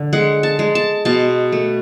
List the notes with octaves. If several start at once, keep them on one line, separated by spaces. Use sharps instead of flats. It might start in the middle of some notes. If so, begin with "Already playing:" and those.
Already playing: D3
G#3 F#5
A5
G#3
A5
B2 A5
A3